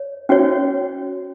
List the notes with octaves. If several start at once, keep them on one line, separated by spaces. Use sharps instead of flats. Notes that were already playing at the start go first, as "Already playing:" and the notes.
Already playing: C#5
C#4 F#4 C#5